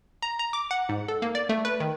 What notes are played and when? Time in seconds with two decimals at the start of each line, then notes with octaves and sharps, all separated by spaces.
0.22 A#5
0.39 A#5
0.53 D6
0.71 F#5
0.89 G#2
1.08 A4
1.22 A#3
1.35 D5
1.49 A3
1.65 B4
1.80 D#3